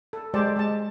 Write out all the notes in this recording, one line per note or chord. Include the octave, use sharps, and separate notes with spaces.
A4
G#3 G4 A4 C5 D5 A5
G#3 A5